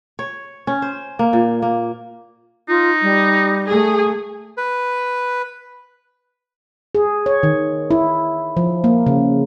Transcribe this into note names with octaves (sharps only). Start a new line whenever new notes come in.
C#5
C#4
C5
A#3
A#2
A#3
D#4 F4
G3
A3 G#4
B4
G#4
C#5
D#3
E4
F3
A#3
C#3